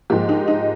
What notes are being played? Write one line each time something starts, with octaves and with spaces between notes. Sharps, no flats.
G#2 F3 A#3 G4
D#4
D#4